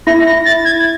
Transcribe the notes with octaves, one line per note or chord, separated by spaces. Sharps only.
E4 A#6
A#6
A6
G#6